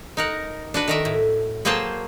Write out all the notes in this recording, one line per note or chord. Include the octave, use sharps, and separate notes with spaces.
D#4 A#4 F#5
D4 F#4 B4
D#3 A#4 E5
A2
F#3 A#3 G#4 C5 G5 A5